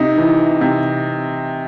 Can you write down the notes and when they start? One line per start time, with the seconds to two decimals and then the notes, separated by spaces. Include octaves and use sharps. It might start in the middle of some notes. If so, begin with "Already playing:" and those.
Already playing: C3 D#4
0.18 E3
0.61 C3